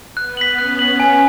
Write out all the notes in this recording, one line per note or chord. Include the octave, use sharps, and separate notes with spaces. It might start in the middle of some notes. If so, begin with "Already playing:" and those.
B3 F#6
B6 F#7
C#4 F#6
B6 F#7
G#5